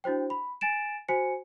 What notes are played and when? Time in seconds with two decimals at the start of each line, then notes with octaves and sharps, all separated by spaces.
0.04 D4 E4 F#4 C5 G5
0.30 B5
0.61 G#5 A6 D7 E7
1.09 F#4 C5 G#5 C#7